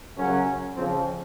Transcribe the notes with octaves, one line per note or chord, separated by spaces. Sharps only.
F#2 C#3 F#3 C#4
F2 C#3 F3 C4